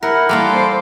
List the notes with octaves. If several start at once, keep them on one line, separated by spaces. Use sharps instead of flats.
E4 A#4 F#5
G3 A#3 E4 A4 C6 D6
C5